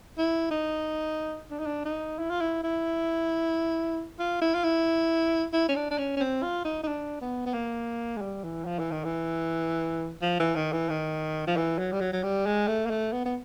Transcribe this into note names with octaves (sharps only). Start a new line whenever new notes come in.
E4
D#4
D4
D#4
D4
D#4
E4
F4
E4
E4
F4
E4
F4
E4
E4
C#4
D4
D4
C#4
C#4
C4
F4
D#4
D#4
D4
B3
B3
A#3
G#3
G3
E3
F3
E3
D#3
E3
F3
E3
D#3
E3
D#3
F3
E3
F#3
G3
F#3
F#3
G3
G#3
A3
A#3
A3
B3
B3